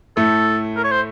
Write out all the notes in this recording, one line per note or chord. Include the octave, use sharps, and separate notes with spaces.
A2 A3 A4
A#4
C#5
C5